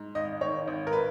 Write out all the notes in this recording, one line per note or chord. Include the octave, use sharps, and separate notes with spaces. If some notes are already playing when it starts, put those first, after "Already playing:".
Already playing: G#2
G#1 D#5
D#3 C#5
G#1
A#4
B4